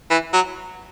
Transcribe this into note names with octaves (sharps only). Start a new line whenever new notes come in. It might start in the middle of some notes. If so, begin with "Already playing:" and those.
E3
F#3